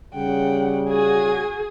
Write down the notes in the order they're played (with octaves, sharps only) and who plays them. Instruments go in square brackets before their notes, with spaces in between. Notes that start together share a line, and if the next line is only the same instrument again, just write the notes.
[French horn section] C#3 G3 [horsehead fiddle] F#5 G5
[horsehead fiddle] F#4 G#5 [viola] G#4